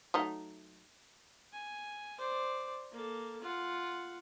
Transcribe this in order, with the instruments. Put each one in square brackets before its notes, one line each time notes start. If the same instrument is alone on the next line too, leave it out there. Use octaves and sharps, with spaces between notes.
[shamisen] F#3 A3 D#4
[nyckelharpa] G#5
C5 D5
A#3 A4
F4 F#5